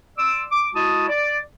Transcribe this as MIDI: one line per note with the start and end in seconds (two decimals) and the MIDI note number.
0.18 0.43 74
0.18 0.43 84
0.18 0.43 86
0.18 0.43 88
0.51 0.68 86
0.75 1.07 56
0.75 1.07 64
0.75 1.07 66
0.75 1.07 75
0.75 1.07 81
0.75 1.07 87
1.09 1.39 74